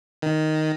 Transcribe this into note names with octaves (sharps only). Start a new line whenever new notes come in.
D#3